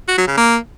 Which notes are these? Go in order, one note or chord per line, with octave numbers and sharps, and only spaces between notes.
F#4
F#3
C#3
A#3